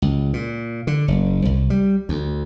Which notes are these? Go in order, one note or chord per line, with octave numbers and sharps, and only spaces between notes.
C#2
A#2
D3
F#1
C2
G3
D2